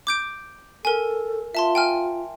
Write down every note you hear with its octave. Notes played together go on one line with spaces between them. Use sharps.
D6 G6 D7
A4 A#4 G#5
F4 E5 A5 C6
G5 G#5 F6